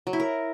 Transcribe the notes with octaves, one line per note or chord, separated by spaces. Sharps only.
F#3
E4
A#4